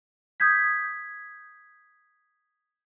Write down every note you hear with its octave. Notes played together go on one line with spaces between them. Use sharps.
D#6 G6 G#6 B6